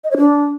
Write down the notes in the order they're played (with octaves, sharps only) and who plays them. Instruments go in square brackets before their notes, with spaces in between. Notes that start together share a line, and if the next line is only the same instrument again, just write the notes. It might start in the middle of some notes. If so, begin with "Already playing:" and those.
[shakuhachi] D#5
C#5
D4